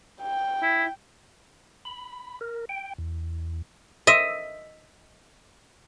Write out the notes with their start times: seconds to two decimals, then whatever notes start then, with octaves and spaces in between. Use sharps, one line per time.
0.22 G5
0.62 E4
1.85 B5
2.41 A#4
2.69 G5
2.98 E2
4.07 D#5 E5